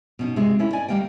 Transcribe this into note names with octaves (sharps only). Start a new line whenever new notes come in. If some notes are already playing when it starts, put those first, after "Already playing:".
B2 C#4 D#4
C3 G#3 F4
A3 C#4 E4
D5 D#5 G#5
D2 G3 A#3 D#5 G5